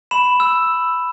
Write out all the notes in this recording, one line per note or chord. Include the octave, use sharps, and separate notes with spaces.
B5 E7
E6